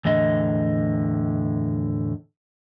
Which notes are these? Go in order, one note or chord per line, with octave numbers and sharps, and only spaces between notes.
E2 A2 D3 D#5